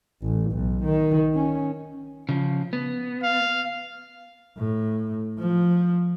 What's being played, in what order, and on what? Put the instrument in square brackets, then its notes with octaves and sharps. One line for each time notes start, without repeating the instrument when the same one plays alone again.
[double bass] A1
B1
D#3
C#4
[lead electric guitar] C#3 F3
B3
[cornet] F5
[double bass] A2
F3